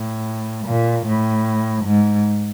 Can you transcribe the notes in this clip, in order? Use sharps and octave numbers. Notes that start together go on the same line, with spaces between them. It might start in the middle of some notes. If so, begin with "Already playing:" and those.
Already playing: A2
A#2
A2
G#2